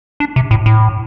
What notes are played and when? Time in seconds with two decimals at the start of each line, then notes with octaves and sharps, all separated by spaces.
0.20 D4
0.36 C3
0.51 A2
0.66 A2